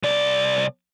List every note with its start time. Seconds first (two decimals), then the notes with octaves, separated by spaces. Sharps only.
0.03 C2 D5